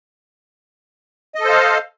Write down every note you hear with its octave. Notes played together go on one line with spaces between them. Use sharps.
A4 C5 D#5 F5